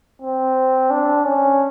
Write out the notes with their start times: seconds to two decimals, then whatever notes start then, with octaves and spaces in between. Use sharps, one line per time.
0.22 C4
0.90 D4
1.25 C#4